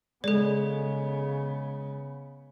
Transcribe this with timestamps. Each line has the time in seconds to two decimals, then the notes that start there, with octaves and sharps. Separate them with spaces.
0.24 C#3 G#3 B3 A4 D5